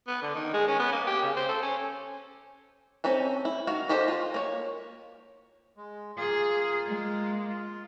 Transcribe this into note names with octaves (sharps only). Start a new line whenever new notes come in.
B3
D3
D#3
G#3
C#4
B3
A#3
G4
C#3
C5
A4
C#4
C4 C#4 D#4 A4
E4
D#3 F#4 F5
F#4 G4 A4 C5 D#5
F4
A#3 C#5
G#3
A#3 F4 G#4
G#3
F4